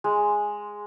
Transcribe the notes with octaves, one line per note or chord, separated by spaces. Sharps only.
G#3